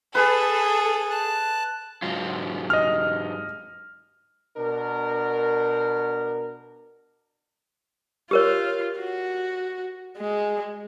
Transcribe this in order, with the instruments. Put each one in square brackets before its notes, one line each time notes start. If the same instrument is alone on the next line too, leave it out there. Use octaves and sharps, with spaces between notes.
[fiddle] G#4 [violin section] A4 [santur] B4
[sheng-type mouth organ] A5 F#6
[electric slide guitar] G#2 F#3 F4
[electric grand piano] D#5 F6
[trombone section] B2 D4 A#4
[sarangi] F4 [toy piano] G4 A#4 C#5
[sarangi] F#4
G#3